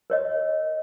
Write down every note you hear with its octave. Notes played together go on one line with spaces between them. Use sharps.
A#4 C#5 D#5